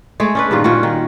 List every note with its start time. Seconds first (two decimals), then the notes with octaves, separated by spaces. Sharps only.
0.20 G#3 A3 G#4
0.35 C#4 D4 B4
0.51 G2 A#2 D#3 F4
0.64 A#2 C#4 F4 F#4
0.83 D#3